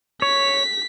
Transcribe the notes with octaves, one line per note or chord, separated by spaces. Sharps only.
C#5 B6